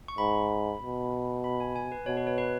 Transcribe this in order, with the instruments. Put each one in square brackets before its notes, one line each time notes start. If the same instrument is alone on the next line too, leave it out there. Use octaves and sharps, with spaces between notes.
[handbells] C#6
[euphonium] G#2 [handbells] B5
[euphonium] B2
[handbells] B5
G#5
G#5
B4
[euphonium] B2 [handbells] C#5
[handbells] B4
C#5
B4